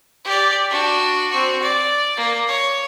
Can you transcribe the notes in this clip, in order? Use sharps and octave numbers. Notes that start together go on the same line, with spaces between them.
G4 D5
D4 F#4
C4 F#4
D5
A#3
C#5